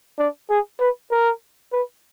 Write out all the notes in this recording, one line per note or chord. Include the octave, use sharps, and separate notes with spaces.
D4
G#4
B4
A#4
B4